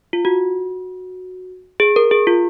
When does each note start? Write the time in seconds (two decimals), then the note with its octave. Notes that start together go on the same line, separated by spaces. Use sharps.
0.13 F4
0.25 F#4
1.80 G#4
1.96 A#4
2.11 G#4
2.27 F4